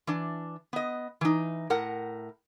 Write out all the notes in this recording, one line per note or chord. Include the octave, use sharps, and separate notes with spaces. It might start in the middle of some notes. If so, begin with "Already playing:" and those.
E3 D4
B3 D#5
E3 D#4
A2 A#4 F#5